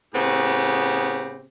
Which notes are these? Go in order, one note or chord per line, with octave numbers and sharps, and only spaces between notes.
A2 C#3 B3 C4 G4